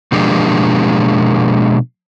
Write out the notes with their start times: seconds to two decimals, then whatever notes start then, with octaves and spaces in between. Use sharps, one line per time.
0.12 B2 F3 G#3 A#3 D4 G4